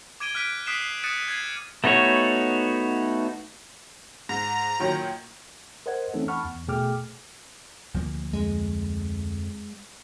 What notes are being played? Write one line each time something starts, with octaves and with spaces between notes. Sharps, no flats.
D6 G#6 D7 D#7 G7
F6 F#6 B6 D7
D#6 F#6 B6 C7 D7 E7
C7
D#6 F#6 A6 C#7 D#7 E7
G#6 C7 D#7
A3 B3 D#4 F#4 C#5
G#2 A#5
A#2 D#3 F#3
A#4 C5 D#5 F#5 G#6
E3 A3 C4 C#4 D#4 A4
F#5 A5 B5 C#6 F6
E2
B2 A3 G#4 G5 D6 F6
D2 F3 A#3
F2 G#3